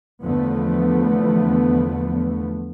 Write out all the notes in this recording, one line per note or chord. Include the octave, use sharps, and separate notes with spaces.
E2 D3 F3 A3 B3